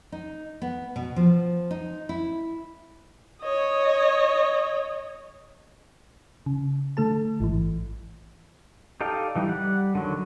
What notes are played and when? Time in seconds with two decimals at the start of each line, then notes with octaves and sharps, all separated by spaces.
0.12 D#4
0.62 B3
0.96 B2
1.16 F3
1.71 D#4
2.09 E4
3.41 C#5 D#5
6.46 C#3
6.97 D3 A3 A4 A5
7.40 A1 G#2 E3
9.01 D#4 G4 A4 D5 F5
9.36 E3 G3 D#4
9.48 G3 F#5
9.95 D3 D#3 F#3